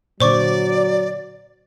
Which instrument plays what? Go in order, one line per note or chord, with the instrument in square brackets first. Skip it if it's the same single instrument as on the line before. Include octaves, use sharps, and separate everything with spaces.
[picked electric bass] A#2 D3 [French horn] F#3 [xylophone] C5 C#6 D6 [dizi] D5